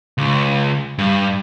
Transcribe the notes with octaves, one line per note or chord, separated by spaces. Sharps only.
C#2
G2